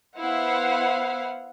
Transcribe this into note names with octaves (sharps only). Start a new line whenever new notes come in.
B3 E4 C5 F5 F#5